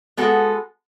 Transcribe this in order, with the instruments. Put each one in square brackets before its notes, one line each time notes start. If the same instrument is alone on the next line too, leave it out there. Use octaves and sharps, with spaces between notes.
[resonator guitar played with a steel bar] G#3 B3 F#4 A4